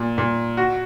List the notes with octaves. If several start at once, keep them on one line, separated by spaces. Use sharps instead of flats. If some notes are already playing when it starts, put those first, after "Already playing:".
Already playing: A#2
A#2
F#4